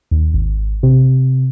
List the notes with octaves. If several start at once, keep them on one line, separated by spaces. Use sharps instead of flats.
D#2
G#1
C3